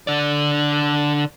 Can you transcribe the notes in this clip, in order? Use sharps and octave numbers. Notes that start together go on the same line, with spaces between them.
D3 D5